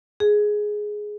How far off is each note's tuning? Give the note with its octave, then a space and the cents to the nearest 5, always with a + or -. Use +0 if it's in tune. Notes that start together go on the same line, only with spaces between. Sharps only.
G#4 +5